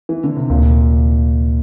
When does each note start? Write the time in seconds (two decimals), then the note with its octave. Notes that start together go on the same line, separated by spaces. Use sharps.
0.09 E3
0.24 D3
0.37 C3
0.50 D2 A#2